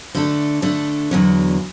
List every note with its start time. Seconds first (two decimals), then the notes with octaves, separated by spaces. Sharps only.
0.15 D3 A3 D4 A4
0.62 D3 A3 D4 A4
1.11 E2 D3 F#3